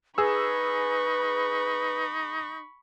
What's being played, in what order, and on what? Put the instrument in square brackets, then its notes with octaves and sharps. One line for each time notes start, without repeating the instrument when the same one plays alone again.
[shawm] D#4 [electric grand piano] G#4 E6 [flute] B4 [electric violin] B5 C#6